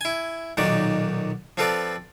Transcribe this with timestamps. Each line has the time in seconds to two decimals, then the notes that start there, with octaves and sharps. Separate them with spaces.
0.01 E4 G#5
0.57 B1 A#2 D#3 F#3 D#4 D5
1.57 F3 C4 F4 A4 B4 D5